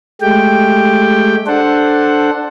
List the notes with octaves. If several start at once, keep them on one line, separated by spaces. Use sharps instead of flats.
G#3 A3 G4 G5
D4 A4 C5 F#5